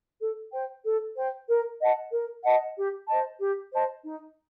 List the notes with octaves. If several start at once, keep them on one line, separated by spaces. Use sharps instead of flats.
A4
C5 G5
A4
C5 G5
A#4
D#5 F#5 A5
A#4
D#5 F#5 A5
G4
C5 D#5 A5
G4
C5 D#5 A5
D#4